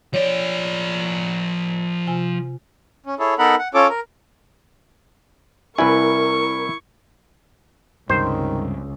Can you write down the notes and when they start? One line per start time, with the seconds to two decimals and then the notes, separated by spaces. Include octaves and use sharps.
0.14 F3 C#5 D5
2.07 C3 F4 G#5
3.06 C#4
3.19 E4 G#4 A4 C#5
3.39 B3 D#4 A4 A#4 F#5 B5
3.59 F#5
3.74 C#4 F4 A4 C#5 D6
3.89 A#4
5.78 C2 E4 A#4 B4 G#5 C#6
8.10 C#2 G2 C3 D#3 G3 C5